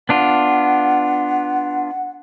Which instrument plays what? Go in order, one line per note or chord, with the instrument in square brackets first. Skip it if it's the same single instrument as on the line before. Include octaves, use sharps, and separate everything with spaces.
[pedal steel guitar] B3 D4 F4 [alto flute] F#5